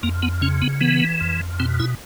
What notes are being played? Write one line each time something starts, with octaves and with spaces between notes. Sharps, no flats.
F2 A#3
B3
C#3 C#4
B3
E3 B3
F2
B2 C4
E4